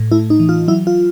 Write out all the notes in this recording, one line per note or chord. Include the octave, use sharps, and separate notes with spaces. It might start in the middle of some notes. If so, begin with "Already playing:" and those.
Already playing: A2
A3 E4
D#4
E3
F4
F#3 E4
F4